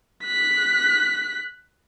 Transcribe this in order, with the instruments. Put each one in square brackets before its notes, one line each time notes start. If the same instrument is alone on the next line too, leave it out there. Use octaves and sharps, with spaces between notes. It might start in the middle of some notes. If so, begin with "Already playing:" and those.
[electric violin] F#6 B6